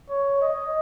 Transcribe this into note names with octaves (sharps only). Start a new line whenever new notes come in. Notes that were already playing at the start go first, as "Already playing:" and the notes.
C#5
D#5